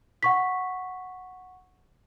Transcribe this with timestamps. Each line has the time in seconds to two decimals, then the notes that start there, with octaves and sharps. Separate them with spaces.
0.23 F#5 C#6 B6